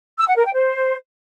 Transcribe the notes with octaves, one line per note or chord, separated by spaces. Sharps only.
E6
F#5
A#4
G5
C5